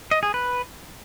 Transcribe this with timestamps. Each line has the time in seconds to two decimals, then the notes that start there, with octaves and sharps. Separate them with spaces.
0.11 D#5
0.23 G#4
0.34 B4